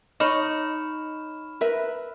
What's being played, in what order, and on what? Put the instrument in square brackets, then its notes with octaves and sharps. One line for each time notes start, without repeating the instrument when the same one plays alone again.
[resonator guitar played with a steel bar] D#4 C#5 [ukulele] D#5 [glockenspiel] B5 F6 E7
[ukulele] A#4 B4 E5